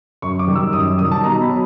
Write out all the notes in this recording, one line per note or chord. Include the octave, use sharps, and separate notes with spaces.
F#2 C#6
D6
D#3 G3
E6
F#2 D#6
D#3 G3 D#6
A5
B2 A#5
B5
F#3